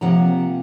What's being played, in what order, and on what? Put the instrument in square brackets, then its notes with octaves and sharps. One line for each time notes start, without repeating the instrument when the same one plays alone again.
[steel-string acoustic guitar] C3 F3 A#3 F#5 A#5